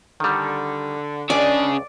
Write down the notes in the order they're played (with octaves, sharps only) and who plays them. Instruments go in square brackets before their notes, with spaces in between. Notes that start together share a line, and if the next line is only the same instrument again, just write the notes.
[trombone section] D3 [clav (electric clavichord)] D#3 G3
[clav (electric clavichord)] C#2 [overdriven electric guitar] C#3 G#4 [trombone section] D4 [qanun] D5